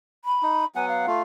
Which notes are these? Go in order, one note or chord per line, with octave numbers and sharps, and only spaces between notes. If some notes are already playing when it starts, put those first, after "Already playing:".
B5
D#4
F#3 B3 F#5 G#5
F5
A3 F4